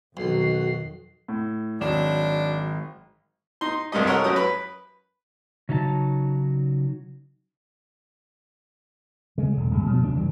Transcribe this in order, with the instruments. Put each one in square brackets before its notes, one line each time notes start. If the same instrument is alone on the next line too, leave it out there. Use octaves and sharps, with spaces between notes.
[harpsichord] B1 [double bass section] F2 D#3 [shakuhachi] F#4 [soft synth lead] C7
[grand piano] A2
[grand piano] G#1 F#3 E7 [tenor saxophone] D4
[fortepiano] D#4 C6
C2 G2 G3 D#5
A4 A#4 C#5 D#5 F#5
F#2 F#3 C#4 D#6
B4
[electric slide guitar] C#3 F#3 D#4 D#5 A5
[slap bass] C#3 G#3
E1 D3
D1 G2 G#3
B2 F3 F#3
F1 D2 C#3 D4
F#1 E3 G3